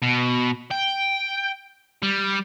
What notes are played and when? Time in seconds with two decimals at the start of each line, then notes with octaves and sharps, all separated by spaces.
0.02 B2
0.71 G5
2.03 G3